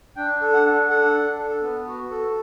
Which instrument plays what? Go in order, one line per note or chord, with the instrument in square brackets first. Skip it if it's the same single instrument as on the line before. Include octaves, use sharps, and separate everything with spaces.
[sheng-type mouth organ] D4 G5
A4
F#5
D4
A4 F#5
D4
A4
B3
F#4
A4